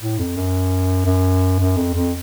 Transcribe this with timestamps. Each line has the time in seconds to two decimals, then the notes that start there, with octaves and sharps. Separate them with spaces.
0.01 A2
0.19 F2
0.37 F#2
1.06 F#2
1.60 F#2
1.77 F2
1.94 F2